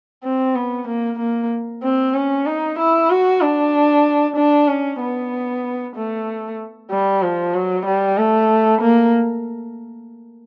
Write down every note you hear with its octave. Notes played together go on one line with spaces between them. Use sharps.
C4
B3
A#3
A#3
C4
C#4
D#4
E4
F#4
D4
D4
C#4
B3
A3
G3
F3
F#3
G3
A3
A#3